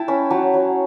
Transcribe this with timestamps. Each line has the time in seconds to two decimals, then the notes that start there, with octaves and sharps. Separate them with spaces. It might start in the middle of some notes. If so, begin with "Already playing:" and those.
Already playing: E4 G5 A5
0.08 C#4 B5
0.30 F#3 A5
0.54 F#3